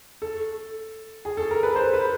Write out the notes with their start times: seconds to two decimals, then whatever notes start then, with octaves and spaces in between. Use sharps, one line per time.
0.22 A4
1.25 G#4
1.37 A4
1.51 A#4
1.63 B4
1.76 C5
1.94 B4